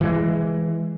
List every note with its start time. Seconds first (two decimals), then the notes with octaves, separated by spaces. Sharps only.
0.01 E3 G#3